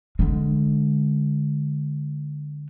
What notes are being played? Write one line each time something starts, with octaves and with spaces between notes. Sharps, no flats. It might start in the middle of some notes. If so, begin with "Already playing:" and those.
D3 G#3